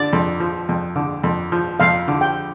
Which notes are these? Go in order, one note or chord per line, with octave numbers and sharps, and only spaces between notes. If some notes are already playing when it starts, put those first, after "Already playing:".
Already playing: D3 D5
F2
F3
F2
D3
F2
F3
F2 F5
D3
G5